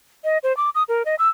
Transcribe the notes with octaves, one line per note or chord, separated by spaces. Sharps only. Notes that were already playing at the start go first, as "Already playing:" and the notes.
D#5
C5
D6
D#6
A#4
D#5
E6